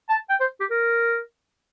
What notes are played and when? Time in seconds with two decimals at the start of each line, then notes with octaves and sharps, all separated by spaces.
0.10 A5
0.30 G5
0.41 C5
0.60 G4
0.71 A#4